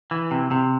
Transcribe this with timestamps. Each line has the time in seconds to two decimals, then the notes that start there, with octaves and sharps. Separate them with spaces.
0.11 E3
0.31 C3
0.51 C3